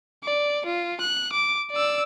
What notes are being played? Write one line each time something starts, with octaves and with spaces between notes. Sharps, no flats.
D5
F4
F#6
D6
D5 E6